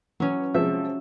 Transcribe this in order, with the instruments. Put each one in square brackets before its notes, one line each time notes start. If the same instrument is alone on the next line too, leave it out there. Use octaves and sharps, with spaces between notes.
[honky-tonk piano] E3 [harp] F#3 C#4
[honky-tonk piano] C3 F3 G#3 [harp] E5